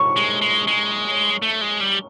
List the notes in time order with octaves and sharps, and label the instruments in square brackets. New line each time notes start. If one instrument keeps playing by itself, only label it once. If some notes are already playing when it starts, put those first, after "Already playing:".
Already playing: [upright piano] C#6
[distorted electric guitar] G#3
G#3
G#3
A3
G#3
G3